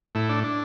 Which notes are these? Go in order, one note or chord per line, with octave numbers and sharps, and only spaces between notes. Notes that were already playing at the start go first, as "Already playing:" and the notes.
A2 E4
D4
D4